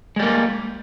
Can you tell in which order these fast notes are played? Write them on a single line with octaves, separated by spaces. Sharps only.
G#3 G3 A#3